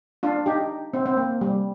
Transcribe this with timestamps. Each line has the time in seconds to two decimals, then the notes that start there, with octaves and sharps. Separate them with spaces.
0.23 D4 F4
0.46 D#4 G4
0.94 C4
1.06 C4
1.17 A#3
1.41 G3